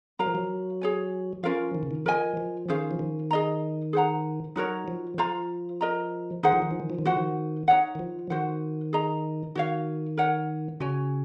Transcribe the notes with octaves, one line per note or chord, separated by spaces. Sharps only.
F#3 A#4 F5 A#5
F3
F#3
G#4 C#5 G#5
F3 C#4 F4 A#4 F5
D#3
C#3
D#3
F3 A#4 D#5 G#5
F3
D#3 C#4 G#4 C5 F5
F3
D#3
G#4 D#5 A#5
G#4 C5 F#5 A#5
F#3 D#4 F#4 A#4 C#5
F3
F3 F4 C5 F5 A#5
A#4 D#5 A#5
D#3 D#4 G#4 C5 F#5
F3
D#3
F3
D#3
F3
D#3
F3 F#4 C5 F#5
D#3
D#4 G#4 C#5 F#5
D#3
F3
D#3 F#4 C5 F#5
G#4 D#5 A#5
D#3 F#4 C#5 F5
A#4 C#5 F#5
C#3 F#4 C#5 G#5